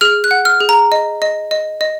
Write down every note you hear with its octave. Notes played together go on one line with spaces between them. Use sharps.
G#4 F6
F#6
F#5
F6
G#4
A#5
D#5
D#5
D#5
D#5